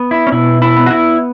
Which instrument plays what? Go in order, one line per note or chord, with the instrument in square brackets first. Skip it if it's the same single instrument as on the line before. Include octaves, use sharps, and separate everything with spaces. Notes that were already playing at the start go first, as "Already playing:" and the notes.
Already playing: [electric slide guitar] B3
E4
C#4
B2 E4
E4
B3
F#4
E4